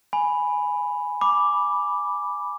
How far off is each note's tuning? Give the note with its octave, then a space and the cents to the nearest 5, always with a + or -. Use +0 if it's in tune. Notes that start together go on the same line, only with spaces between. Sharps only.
G#5 +0 B5 +0
B5 -10 D6 +0